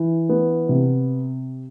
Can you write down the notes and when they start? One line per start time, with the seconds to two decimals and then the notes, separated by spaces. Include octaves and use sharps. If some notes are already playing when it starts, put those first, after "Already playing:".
Already playing: E3
0.29 B3
0.69 C3